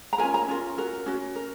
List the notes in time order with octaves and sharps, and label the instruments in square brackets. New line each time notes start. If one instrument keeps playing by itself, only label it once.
[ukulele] A#5
C#4 F4 A#4 G#5
A#5
C#4 F4 A#4
C#4 F#4 A#4
C#4 F#4
A#4